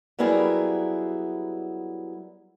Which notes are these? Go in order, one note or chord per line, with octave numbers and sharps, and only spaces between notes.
F#3 G3 B3 E4 G#4 A#4